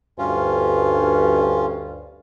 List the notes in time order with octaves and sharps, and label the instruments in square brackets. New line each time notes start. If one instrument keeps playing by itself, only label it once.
[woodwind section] D2 G2 [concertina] C#4 F4